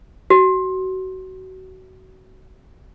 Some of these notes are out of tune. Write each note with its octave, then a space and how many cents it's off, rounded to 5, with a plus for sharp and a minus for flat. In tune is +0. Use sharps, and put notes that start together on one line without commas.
F#4 +25